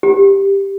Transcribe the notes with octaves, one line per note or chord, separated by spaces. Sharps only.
G4